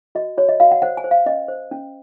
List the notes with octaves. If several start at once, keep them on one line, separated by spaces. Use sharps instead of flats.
F#4 D#5
F#4 C#5
D#5
F#4 F5
F#5
C5 F#5
G#5
C5
F5
C#4 D#5
C5
C#4